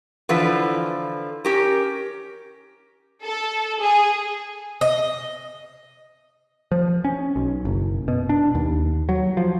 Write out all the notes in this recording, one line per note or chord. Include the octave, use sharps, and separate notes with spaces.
D3 E3 F3 F4 A4 B4
C#4 G4 A#4
A4
G#4
D#5
F3
C#4
B1
F#1
B2
D4
D#2
F#3
F3